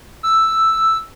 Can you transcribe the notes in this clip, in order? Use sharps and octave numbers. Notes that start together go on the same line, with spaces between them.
E6